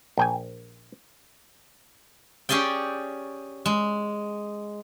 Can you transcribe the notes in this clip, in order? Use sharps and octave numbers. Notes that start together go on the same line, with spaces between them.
A#1 G5 G#5
C#4 G4 G#4 D5 G5
G#3